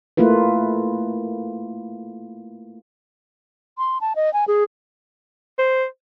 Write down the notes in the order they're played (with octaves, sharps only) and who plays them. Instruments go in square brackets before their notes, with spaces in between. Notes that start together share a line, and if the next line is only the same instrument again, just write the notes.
[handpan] A3 A#3 E4 F4 B4
[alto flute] C6
A5
D#5
G#5
G#4
[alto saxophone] C5